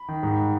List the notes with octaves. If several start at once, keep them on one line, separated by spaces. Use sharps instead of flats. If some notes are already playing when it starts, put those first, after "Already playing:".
Already playing: B5
D#3
G#2